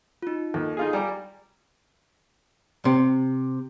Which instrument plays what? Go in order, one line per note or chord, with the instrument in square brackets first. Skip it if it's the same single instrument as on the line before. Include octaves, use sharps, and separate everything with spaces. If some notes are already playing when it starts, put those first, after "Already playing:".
[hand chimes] D#4 F4
[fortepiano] D#2 [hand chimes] A4
[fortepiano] D#4 F4 G#4
[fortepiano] G3 [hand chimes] G#5 A#5 D6
[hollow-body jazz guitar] C3